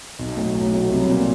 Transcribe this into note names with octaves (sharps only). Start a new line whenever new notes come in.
B1
A2 F#3 A3
B1
A2 F#3 A3
C2
A#2 F#3